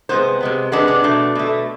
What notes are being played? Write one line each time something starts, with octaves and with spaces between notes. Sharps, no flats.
C3 G#3 B3 C5
C3 G#3 B3
C3 G#3 B3 D4
D4
B2 A3
B2 A3